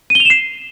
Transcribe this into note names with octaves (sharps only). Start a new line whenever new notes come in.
D#7
G7
F7
E7
C7